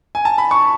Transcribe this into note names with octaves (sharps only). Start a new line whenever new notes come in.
G#5
A5
B5
C#6